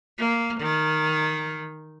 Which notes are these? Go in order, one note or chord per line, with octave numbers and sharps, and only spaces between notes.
A#3
D#3